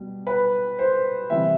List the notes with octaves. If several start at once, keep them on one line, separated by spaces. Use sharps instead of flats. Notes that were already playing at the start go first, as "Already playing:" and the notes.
Already playing: B2 G3
B4
C5
C3 E3 G3 E5